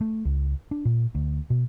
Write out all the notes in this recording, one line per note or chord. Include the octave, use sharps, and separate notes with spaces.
A3
C#2
D4
A#2
D2
B2